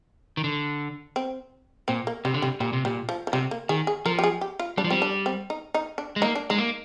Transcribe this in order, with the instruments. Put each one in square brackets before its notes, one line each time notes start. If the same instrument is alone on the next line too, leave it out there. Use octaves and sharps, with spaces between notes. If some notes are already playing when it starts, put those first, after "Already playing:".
[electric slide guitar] D#3
D3
[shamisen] C4
[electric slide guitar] A#2 [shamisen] C4
[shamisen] A#3
[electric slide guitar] C3 [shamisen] G3
[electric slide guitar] D3
[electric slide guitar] C3 [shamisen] G3
[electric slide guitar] A#2 [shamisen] G3
[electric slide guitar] C3
[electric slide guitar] A#2 [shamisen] G3
[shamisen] F3
F3
[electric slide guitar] C3 [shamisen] G3
[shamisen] A#3
[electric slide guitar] D#3 [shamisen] G#4
[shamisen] G#4
[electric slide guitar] F3 [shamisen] A#4
[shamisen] G4
G#4
G4
F4
[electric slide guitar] G3 [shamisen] D4
[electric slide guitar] F3
[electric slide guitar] G3 [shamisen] C4
[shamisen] D4
C4
D#4
D#4
D4
[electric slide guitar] G#3
[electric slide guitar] A#3 [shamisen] D#4
[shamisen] D4
[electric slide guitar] G#3 [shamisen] D#4
[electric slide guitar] A#3